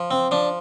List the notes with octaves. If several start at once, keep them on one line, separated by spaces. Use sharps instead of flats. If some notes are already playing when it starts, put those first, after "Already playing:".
Already playing: F3
C4
F3 D4